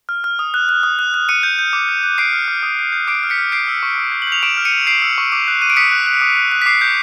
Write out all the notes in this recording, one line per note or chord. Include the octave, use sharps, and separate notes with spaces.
F6
F6
D#6
F#6
F#6
D#6
F#6
F#6
D#6 C#7 D#7
G6
G6
D6
F#6
F#6
D6 C7 D7
F6
F6
D#6
G6
G6
D6 C7 D7
F6
B6 C#7
F6
G6 C7 D7
E6
C#6
D#6
G6
F#7
G6 F7
C#6 D7 E7
F6
C#7 D#7
F6
G6 C7 D7
E6
C#6
D6
F#6
F#6 D#7
D7
D#6 B6 C#7
F#6
F#6
D#6
F#6
F#6
B6
D6 C7
G6